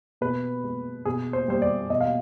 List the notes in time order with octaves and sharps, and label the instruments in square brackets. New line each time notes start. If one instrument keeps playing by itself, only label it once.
[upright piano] B2 B4
G#3
B2 G#4
C5
G3 C5
D5
B2 D#5
F5